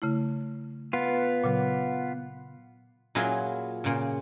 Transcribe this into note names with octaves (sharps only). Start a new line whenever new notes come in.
C#3 A3 E4
B3 F4
A#2 C#3 F#3
A#2 F#3 E4 F4 G#4 B5
A#2 C#3